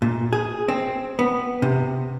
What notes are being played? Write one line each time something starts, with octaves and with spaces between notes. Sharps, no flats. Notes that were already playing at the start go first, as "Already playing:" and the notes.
A#2
G#4
C4
B3
C3